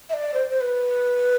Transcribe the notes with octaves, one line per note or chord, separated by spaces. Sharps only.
E5
D5
C5
C5
B4